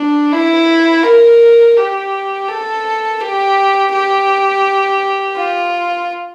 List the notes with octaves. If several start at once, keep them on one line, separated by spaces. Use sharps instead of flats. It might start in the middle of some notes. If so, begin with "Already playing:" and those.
Already playing: D4
E4
A#4
G4
A4
G4
G4
F4